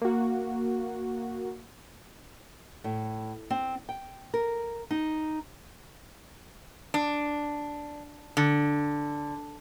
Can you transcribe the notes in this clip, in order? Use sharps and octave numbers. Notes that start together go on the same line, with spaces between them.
A#3 F#4
A2
C4
G5
A#4
D#4
D4
D3